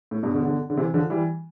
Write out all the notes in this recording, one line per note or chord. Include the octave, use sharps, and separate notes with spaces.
A2
G2 B2
B2 D3
B2 D3
D3
C3 E3
D3 F3
E3 G3